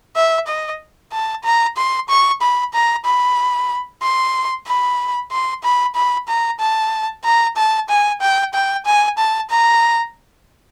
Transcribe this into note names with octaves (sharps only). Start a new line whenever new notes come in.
E5
D#5
A5
A#5
C6
C#6
B5
A#5
B5
C6
B5
C6
B5
B5
A#5
A5
A#5
A5
G#5
G5
G5
G#5
A5
A#5